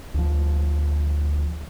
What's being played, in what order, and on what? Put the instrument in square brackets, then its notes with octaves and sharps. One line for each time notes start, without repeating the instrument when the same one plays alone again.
[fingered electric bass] D2 F3